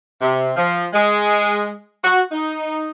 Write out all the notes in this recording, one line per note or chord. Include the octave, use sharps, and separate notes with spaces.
C3
F3
G#3
F#4
D#4